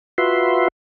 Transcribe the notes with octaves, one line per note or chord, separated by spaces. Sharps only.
F4 F#4 B4 E5 C6